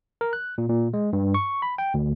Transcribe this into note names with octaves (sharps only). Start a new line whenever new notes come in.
A#4
F#6
A#2
A#2
G#3
G2
C#6
B5
G5
D2